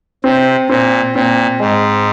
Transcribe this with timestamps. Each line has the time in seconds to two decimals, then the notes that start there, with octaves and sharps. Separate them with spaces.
0.24 C3 C4
0.69 A#2 C4
1.15 A#2 C4
1.60 G#2 G#3